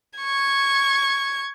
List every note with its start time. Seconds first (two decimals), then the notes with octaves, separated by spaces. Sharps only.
0.19 C#6 G#6